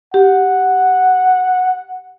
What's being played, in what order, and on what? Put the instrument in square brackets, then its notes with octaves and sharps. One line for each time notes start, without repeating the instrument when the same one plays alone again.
[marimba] G4 [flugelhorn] F#5